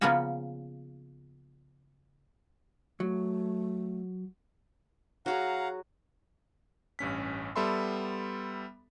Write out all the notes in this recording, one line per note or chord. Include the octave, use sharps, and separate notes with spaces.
C#3 F3 A#3 B3 C#4 F#4
F#3 A3
F#3 F#4 G#4 F5 F#5 A#5
A1 G2 C#4 B6
G3 B3 A4 E5 B5 C6